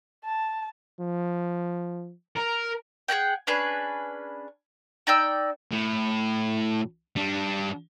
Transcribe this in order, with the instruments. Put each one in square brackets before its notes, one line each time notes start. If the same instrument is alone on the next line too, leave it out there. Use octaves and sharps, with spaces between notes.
[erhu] A5
[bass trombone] F3
[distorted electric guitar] A#4
[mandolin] G#4 A#4 F#5 G5
C#4 D4 G#4 B4
D#4 D5 G5 E6
[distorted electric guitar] A2
G3 D4